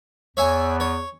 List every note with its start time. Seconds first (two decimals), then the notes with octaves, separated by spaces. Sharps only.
0.37 E2 C#5 E5 G#5
0.80 C#5